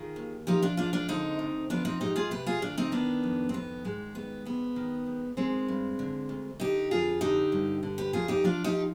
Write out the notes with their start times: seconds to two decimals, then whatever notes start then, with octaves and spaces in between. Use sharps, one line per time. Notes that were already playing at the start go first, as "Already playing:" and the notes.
Already playing: D#3 F4 G#4
0.16 D#2
0.47 F3 D#4 G4
0.62 D4 F4
0.77 G#2 D4 F4
0.93 D4 F4
1.08 D3 C4 D#4
1.39 D2
1.70 F3 B3 D4
1.85 C4 D#4
2.00 G#2 D#4 G4
2.16 F4 G#4
2.31 C3 G4 B4
2.46 F4 G#4
2.62 D2 D4 F4
2.78 C4 D#4
2.91 D#3 B3 D4
3.23 F2
3.49 C4
3.53 D#3 B3
3.85 G#2 G#3
4.15 D#3 B3
4.45 G#2 B3
4.76 D#3
5.06 G#2
5.37 D#3 G#3 C4
5.68 G2
5.99 D3
6.29 D2
6.60 D3 D#4 G4
6.91 F2 F4 G#4
7.21 D3 D#4 G4
7.52 G2
7.83 D3
7.98 G4 B4
8.13 F2 F4 G#4
8.28 D#4 G4
8.44 F3 D4 F4
8.64 D#4 G4